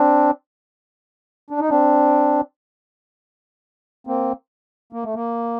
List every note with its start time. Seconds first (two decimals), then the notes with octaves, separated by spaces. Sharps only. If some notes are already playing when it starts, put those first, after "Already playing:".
Already playing: C4 D4
1.50 D4
1.60 D#4
1.70 C4 D4
4.07 A#3 C4
4.93 A#3
5.03 A3
5.15 A#3